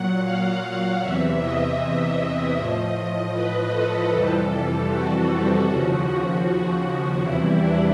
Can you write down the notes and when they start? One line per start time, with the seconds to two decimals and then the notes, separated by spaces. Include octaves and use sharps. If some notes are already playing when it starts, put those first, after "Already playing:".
Already playing: A#2 F#3 F#5
0.23 F5
1.01 E2 C3 E3 E5
1.40 D#5
2.56 A2 F3
3.32 B4
3.72 A4
4.10 F2 C3 E3 G3 A4
4.88 F#4
5.66 D#2 C#3 F3
7.20 E2 C3 E3 G3 E4
7.59 D4